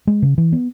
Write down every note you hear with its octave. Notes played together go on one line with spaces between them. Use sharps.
G#3
C#3
E3
B3